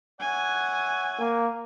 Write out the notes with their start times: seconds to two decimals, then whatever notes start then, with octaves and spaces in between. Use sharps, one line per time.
0.20 C#5 E5 F#5 G#5
1.20 A#3